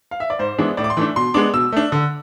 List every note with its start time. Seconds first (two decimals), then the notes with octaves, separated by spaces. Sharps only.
0.11 F5
0.20 E5
0.30 D5
0.39 G#2 C5
0.58 E3 G#3 B3 D4
0.77 A2 D5
0.84 D6
0.90 C6
0.97 E3 A3 D4
1.16 B2 C6
1.34 G#3 B3 D4 D6
1.53 B2 E6
1.72 A3 D4
1.92 D3